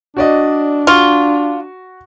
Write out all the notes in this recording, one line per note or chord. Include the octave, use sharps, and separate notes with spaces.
D4 F#4 D5 D#5
F4 F#4 C#6